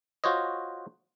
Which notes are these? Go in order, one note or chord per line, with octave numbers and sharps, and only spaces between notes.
F4 F#4 C5 C#5 D#5